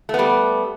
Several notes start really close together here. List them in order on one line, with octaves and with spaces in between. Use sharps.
A3 B3 G3